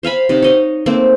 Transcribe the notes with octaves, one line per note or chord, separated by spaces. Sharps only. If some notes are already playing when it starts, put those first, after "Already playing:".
C5 F5 G#5 B5
C3 D#4
C#5 D#5
A3 A#3 C4